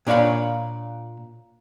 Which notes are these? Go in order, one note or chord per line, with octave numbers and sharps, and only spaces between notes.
A#2 D4 C#5 F5 B5